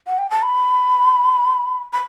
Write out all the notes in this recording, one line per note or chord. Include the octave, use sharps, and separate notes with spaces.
F#5
G5
A5
B5
B5